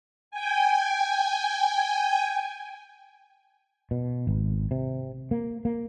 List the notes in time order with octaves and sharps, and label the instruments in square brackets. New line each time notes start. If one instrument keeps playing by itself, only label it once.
[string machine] G5 G#5
[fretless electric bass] B2
G#1
C3
A#3
A#3